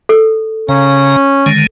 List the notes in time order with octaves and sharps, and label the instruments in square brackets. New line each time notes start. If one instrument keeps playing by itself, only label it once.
[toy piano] A4
[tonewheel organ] C#3 F5 A#5 [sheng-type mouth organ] C#4
[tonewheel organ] D3 D#3 G#3